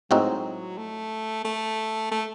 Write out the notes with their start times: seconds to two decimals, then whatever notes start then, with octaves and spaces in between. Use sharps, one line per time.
0.11 A2 F#3 G#3 C4 D#4 F#4
0.78 A3
1.44 A3
2.11 A3